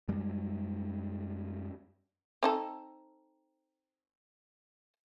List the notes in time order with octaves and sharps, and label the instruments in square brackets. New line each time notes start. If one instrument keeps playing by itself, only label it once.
[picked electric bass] F#2 G3 G#3
[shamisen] C4 D#4 A4